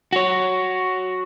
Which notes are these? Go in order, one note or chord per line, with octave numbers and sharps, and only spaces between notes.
F#4 C#5